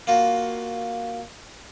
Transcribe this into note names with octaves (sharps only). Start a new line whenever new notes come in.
A#3 F4 F#4